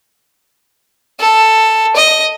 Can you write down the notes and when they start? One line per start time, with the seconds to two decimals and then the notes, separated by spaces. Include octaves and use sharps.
1.20 A4
1.95 D#5